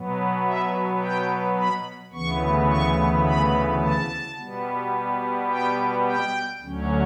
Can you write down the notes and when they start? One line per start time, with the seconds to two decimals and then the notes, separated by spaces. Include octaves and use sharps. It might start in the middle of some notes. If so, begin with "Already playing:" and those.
Already playing: B2 F#3 B3
0.45 E5
1.01 G5
1.57 B5
2.13 D2 C#3 E3 B3 C#6
2.69 C#6
3.25 B5
3.81 A5
4.37 B2 G3 B3
5.49 G5
6.05 G5
6.61 D2 D3 F#3 C#4